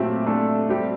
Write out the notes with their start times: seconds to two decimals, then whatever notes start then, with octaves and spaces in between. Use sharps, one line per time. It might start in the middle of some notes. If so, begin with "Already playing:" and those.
Already playing: A#2 F#3 A3 C4 G4
0.26 A3 D4 A4
0.69 G3 C4 G4